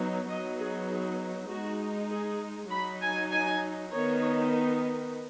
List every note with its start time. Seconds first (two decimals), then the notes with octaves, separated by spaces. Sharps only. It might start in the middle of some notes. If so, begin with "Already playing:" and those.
Already playing: F#3 B3 D#4
0.29 F#3 B3 D#4 D#5
0.60 G#4
0.90 G#4
1.50 G#3 D#4 F#4
2.11 G#4
2.71 F#3 D#4 B5
3.01 G#5
3.32 G#5
3.92 D#3 B3 D#4 C#5